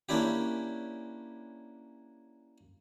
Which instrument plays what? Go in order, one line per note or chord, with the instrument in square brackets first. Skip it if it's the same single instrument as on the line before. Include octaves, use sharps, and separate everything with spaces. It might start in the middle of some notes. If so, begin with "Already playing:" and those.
[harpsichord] A#3 C#4 D4 E4 G4